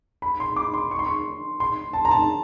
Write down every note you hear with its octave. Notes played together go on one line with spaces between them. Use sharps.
B5
C6
D6
C6
C#6
C6
C#6
C6
A5
A#5
A5